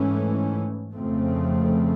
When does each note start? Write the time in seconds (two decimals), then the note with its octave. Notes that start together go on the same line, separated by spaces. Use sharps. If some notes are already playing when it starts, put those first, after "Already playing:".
Already playing: G#2 E3 A3 C#4
0.93 F2 C#3 F3 A3 C4